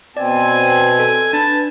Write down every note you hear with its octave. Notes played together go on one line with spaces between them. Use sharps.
B2 C4 D5 G#5
A4
D4 B4 A5